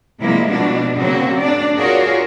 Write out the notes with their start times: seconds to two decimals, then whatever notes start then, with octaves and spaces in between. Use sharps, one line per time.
0.21 C3 F3 G3 G#3 A#3 E4
0.51 B2 D4 F#4
0.97 C#3 F#3 A#3 C4 F#4
1.40 D4 D5
1.77 F4 F#4 G#4 A#4 C#5 D5